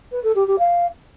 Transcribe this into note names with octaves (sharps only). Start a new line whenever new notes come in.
B4
A4
G4
G4
F5